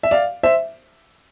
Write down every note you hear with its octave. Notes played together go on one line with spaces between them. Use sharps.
E5
D5 F5
C5 E5